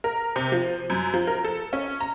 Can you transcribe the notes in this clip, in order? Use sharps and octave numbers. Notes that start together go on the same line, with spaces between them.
A#4
C3
F3
F#2
F3
A#4
A4
C#4
A#5